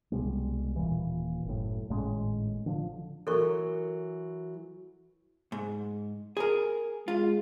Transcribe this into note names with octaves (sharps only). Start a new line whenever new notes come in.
C2 B2 G3 G#3
D#1 A#2 E3
F#1 A2
G#1 A2 G#3 C#4
D3 F3
E3 F#3 A4 A#4 C#6
G#2
G#4 A#4
G#3 F4